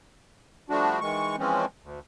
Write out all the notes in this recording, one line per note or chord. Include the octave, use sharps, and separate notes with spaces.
F3 G3 A3 D4 F#4
D#3 E3 G#3 C#6
E3 F3 G#3 C4 C#4
D2